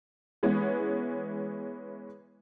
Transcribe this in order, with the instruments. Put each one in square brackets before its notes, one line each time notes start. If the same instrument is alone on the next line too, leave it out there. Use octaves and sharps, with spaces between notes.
[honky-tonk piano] E3 G#3 B3 C#4